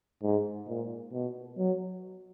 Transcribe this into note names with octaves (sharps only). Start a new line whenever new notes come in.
G#2
A#2
B2
F#3